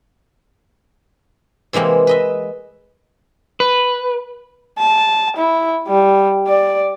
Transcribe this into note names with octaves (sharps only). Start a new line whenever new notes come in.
C3 E3 G#3 A#3 C4
B4 D#5 E5
B4
A5
E4
G3
D5